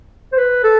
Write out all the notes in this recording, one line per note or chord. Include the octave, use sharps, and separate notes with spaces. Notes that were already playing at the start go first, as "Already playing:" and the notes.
C5
B4
A4